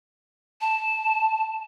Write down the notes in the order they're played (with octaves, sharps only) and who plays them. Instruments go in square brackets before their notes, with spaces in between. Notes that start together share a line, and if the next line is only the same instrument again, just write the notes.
[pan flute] A5